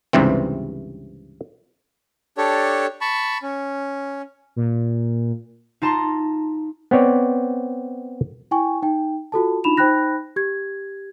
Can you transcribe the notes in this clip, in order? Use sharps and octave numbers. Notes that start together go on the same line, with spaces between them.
C#2 G2 C3 E3 C4
D4 G4 A4 C#5
A5 B5 C#6
C#4
A#2
D#4 F4 A5 A#5 C6
B3 C4 C#5 D5
E4 G5 G#5 C#6
D#4 G5
F4 F#4 A4 A5
D4 D#4 F4 B5 E7 F7
D#4 C5 G5 B5 F#6 A#6
G4 G#6